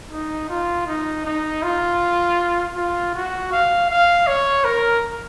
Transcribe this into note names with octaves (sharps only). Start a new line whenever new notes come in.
D#4
F4
D#4
D#4
F4
F4
F#4
F5
F5
C#5
A#4